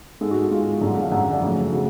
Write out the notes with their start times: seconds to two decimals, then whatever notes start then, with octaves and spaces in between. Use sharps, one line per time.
0.21 G#2 G#3 A4
0.31 F#4
0.51 G#2 G#3 F4
0.81 F#2 D3 G#3 D4
0.91 A4
1.02 F5
1.12 F#2 D3 G#3 F#5
1.22 F#5
1.32 D5
1.42 F2 C#3 F#3 A3
1.72 C#3 F#3 A3